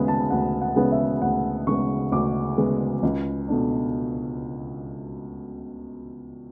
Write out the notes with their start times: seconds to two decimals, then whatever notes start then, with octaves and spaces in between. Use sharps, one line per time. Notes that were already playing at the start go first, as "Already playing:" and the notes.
Already playing: D2 C#3 G#3 B3 B5
0.08 A5
0.31 D2 F#5
0.61 F#5
0.76 C#3 G#3 B3
0.92 E5
1.22 D2 F#5
1.67 C#3 G#3 B3 C#6
2.12 D2 D6
2.57 C#3 G#3 B3
3.03 C#2
3.48 B2 A3 D4